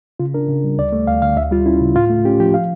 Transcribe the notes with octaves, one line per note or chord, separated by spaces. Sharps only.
C#3 F4
D4 A#4
C#3
G3
D2 D5
A3
D2 F5
D3 F5
D2 E5
G3 F4
C#4 E4
C#3
A2 F4
A3
C#4 G4
F3 G4
F5